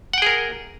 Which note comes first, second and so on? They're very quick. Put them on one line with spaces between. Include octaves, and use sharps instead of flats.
F#5 G5 G#4 A#4